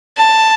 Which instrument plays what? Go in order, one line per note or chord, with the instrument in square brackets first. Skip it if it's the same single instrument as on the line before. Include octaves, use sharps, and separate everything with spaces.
[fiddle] A5